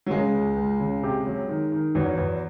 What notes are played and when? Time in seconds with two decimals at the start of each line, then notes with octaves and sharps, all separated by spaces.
0.06 F#3
0.11 C#3 G#3
0.34 C#2
0.56 C#2
0.80 C#3
1.03 C3
1.26 F#3
1.48 D#3
1.72 D#3
1.95 E2 F#3
2.17 E2